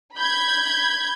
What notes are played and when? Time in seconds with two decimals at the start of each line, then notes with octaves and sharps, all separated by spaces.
0.16 B5 G6 G#6